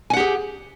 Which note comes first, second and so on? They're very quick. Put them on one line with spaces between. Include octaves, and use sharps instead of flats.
G#5 F#5 G4 G#4